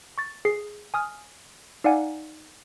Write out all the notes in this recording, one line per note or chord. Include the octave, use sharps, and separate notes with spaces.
C#6 A6
G#4 C7
G#5 D#6 F6
D#4 D5 F5 F#5 G#5